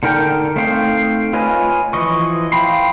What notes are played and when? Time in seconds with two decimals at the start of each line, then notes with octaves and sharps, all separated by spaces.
0.03 D3 D#4 A#4 G5
0.56 A3 C4 D#4 F5 G5
1.33 F4 B4 C#5 D#5 G#5
1.93 E3 F3 D#5 C#6
2.52 F5 G5 B5 C6